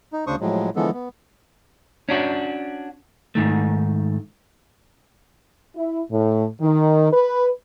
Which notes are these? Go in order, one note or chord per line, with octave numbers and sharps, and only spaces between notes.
D#4
D2 C#3 D4 C5 C#6 D#6
A2 F3 F#3 G#3
D3 E3 F3 G#3 B3 A4
B3
C#4 D4 F#4
G#2 D#3 A3
E4
A2
D#3
B4